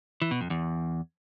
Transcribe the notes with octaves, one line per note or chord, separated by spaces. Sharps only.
E3
B2
F2
E2